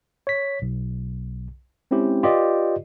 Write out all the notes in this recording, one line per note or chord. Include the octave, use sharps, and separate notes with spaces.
C#5 B6
B1
G#3 C4 C#4 E4 G4
F4 G4 B4 D5 D#5